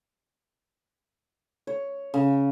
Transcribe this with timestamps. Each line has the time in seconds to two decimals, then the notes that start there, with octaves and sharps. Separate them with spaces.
1.67 C#5
2.14 C#3